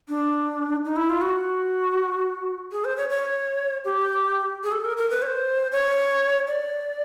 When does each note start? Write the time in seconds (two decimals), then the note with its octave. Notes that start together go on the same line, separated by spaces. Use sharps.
0.08 D4
0.85 D#4
0.96 E4
1.09 F4
1.21 F#4
2.72 G#4
2.84 C5
2.97 C#5
3.09 C#5
3.85 G4
4.63 G#4
4.72 A4
4.85 A#4
4.97 A#4
5.10 B4
5.22 C#5
5.26 C5
5.72 C#5
6.47 D5